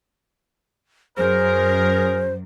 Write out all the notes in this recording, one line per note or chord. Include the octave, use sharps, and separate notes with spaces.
F#2 G#4 A#4 C5